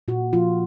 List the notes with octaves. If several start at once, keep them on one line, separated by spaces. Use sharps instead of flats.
A#2 F#4
F3 F4